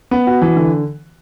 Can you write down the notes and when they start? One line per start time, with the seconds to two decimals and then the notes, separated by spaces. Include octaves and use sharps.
0.11 B3
0.27 F#4
0.42 E3
0.56 D3